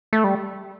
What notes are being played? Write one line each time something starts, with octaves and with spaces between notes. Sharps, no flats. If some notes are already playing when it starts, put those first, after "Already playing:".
A3
G3